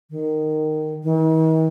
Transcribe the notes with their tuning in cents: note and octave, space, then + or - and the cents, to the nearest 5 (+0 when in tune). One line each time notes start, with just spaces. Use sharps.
D#3 -10
D#3 +45